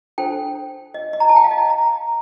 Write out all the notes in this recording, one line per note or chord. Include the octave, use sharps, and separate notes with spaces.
D4 A4 C5 G5
D#5
D#5
A#5
A5
G5
F5
D#5
A#5